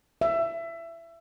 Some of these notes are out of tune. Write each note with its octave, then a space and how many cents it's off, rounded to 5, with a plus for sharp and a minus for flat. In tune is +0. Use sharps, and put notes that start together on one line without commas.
E5 +20